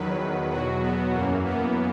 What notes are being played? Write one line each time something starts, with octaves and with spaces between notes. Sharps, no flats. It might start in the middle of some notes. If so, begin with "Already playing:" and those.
Already playing: E2 D#3 F#3 B4
E2 B2 F#3 F#4
B3
F#2 E3 A#3
B3